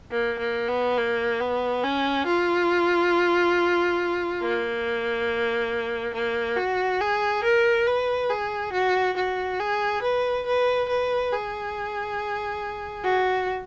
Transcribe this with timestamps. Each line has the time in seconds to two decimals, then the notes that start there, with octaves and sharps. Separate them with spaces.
0.12 A#3
0.39 A#3
0.68 B3
0.98 A#3
1.41 B3
1.84 C#4
2.26 F4
4.43 A#3
6.14 A#3
6.57 F#4
7.01 G#4
7.44 A#4
7.87 B4
8.30 G#4
8.73 F#4
9.17 F#4
9.60 G#4
10.02 B4
10.46 B4
10.89 B4
11.32 G#4
13.05 F#4